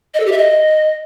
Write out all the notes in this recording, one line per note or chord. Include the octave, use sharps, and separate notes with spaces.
D#5
A4
G4
E5
D#5